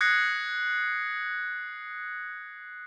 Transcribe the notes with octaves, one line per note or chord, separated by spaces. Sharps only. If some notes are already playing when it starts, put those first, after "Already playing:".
D#6 F#6 G#6 A#6 C7 C#7